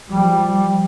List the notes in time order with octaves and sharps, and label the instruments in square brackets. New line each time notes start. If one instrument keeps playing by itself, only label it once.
[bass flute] F3 [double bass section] G3